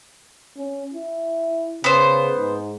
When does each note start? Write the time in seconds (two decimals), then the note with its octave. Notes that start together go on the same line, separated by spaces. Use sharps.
0.57 C#4
0.94 E4
1.84 C#3 B3 C5
2.37 G#2